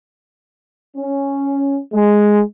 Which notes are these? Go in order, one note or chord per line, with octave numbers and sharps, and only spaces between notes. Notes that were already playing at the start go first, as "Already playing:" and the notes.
C#4
G#3